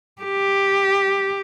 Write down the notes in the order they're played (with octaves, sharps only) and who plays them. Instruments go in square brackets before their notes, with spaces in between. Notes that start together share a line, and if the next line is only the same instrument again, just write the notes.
[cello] G4